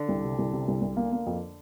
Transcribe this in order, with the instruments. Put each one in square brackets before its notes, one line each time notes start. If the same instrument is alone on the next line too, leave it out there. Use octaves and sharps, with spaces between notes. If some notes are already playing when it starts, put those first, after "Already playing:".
Already playing: [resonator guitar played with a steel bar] D3
[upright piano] C2
C3
C2
C3
C2
C2
A#3
A#3
F2